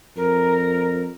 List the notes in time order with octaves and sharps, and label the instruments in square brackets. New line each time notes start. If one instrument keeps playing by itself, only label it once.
[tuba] F2 [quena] A#4